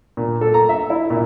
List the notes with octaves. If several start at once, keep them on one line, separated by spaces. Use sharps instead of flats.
A#2
A4
A#5
E5
E4
A#2